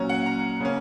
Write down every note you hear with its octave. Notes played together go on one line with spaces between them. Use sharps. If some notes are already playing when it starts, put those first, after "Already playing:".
Already playing: A#2 F#3 C#4 A#5
F#5
A#5
C#3 A#3 C#4